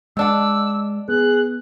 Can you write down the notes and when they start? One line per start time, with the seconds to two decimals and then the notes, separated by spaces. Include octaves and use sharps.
0.17 B2 G#3 D4 F#5 E6
1.09 B3 G#4 F#6